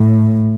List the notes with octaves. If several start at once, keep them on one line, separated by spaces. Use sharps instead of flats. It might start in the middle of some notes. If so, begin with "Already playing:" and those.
Already playing: A2